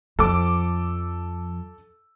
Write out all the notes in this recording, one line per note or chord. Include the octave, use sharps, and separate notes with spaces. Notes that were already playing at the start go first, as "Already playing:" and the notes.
F2 F3 A4 D6